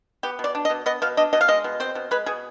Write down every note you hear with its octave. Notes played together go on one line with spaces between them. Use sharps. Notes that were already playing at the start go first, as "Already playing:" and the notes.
B3 G4
B2
D5
D4
D#5
B2
B3 D#5
B2 F5
D4 D#5
B2 D#5
F5
G#3 D#5
B2
C4 C5
B2
G#3 B4
B2 G#4